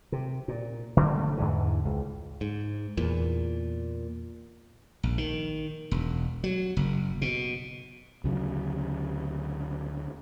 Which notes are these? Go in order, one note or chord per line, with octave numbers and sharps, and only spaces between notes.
C3
A#2
D3 G3 A3 A#3
D3 A3
E2 G#2 D3 E3
C#2
G#2
E2 A#2
A#1
D#3
E1
F#3
F#1
B2
D2 C#3 F#3